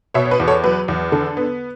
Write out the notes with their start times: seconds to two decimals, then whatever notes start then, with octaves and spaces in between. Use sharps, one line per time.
0.14 B2 C#5 E5
0.25 C#5
0.31 B4
0.40 E2
0.47 A4 C#5
0.64 F#3 B4
0.88 E2
1.12 D3 A4
1.37 B3